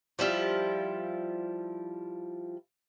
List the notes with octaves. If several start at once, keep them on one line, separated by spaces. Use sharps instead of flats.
F3 G3 E4 F4